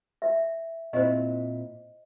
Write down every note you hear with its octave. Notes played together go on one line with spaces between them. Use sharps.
E5
A#2 C4 E4 C5 D#5